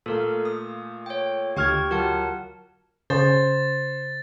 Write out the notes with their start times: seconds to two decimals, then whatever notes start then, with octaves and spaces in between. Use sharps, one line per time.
0.06 A#2 A3 A4 A#4 F5
0.45 D#6
1.06 C#5 G5
1.57 D2 G4 G5 C#6 F6 G#6
1.91 F#3 F4 G4 A#4 F#5 A5
3.10 C#3 C5 A6